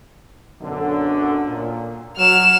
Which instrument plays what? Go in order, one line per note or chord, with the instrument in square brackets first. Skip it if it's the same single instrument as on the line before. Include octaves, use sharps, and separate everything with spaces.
[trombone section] B1 F#2 D3
A#2
[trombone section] F#3 [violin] F6 E7